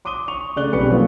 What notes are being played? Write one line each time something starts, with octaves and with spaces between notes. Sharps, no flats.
C6 D6 D#6 D#7 G7
C#6 F7
C#3 A3 D5 F#6 G7
B1 G3 C4 B4 C#6 C#7
F3 F#3 A3 A#3 F4